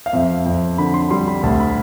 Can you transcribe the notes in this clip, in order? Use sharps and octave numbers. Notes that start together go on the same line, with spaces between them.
F5
F2 E5
F2
D3 B5
C6
G3 C6
B5
D2 A5
B5